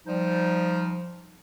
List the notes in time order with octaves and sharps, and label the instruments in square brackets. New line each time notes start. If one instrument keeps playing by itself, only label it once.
[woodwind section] F3 G3 D#4